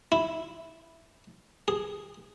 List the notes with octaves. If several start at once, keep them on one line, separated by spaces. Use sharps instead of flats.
E4
G#4